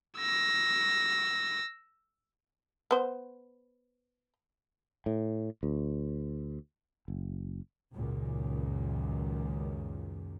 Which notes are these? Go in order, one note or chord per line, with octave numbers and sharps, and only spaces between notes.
E6 A#6
B3 C5
A2
D2
F#1
C#2 F#2 A#2 D#3